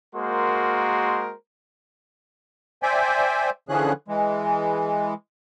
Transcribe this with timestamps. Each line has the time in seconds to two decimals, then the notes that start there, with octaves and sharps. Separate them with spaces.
0.15 G#3 A#3 F#4 A#4 C5 C6
2.83 C5 D5 E5 G5 G#5
3.69 D3 E3 F3 C#4 G#4 F#6
4.08 E3 G#3